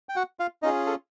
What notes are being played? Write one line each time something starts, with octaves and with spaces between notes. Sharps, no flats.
G5
F#4 F#5
F4 F5
C#4 D#4 F4 G#4 D#5
A4